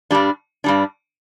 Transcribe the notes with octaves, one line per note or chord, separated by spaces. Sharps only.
G2 G3 D4
G2 G3 D4